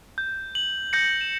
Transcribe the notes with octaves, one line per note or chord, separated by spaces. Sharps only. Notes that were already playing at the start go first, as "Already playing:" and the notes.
G6
F#7
G6 A#6 C#7
E7